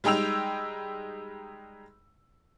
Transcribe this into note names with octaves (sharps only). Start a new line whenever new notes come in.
G3 G#3 D#4 G5 E6 F7